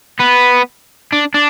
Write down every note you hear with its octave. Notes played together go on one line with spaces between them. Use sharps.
B3
D4
D4